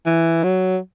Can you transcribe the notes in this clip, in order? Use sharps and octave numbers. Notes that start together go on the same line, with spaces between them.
E3
F#3